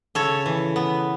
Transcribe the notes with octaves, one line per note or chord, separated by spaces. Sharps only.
C#3 A4 C#5
E3
B3